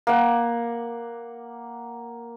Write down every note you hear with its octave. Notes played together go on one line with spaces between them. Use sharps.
A#3 F#5